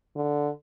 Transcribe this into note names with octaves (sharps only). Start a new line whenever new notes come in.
D3